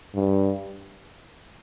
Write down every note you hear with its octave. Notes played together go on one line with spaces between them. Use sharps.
G2